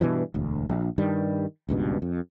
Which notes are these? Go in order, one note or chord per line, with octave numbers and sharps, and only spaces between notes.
G2 B2 E3 F3
E1 D2
A#1
G2 D#3 G3
D#1 C#2 G2 B2
F2